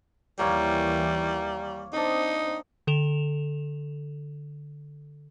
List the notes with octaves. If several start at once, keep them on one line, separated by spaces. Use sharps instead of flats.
D#2 E3 G3 A#3 C#5 F5
C4 D4 D#4 D#6
D3 A4 E7 F7